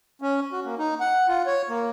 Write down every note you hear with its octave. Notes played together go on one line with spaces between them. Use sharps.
C#4
F#4
A#3
D#4
F#5
F4
C#5
A#3